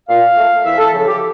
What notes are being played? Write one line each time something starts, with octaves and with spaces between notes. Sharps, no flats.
A#2 F5
A3
E2 E5
A4
C#3 F3
G4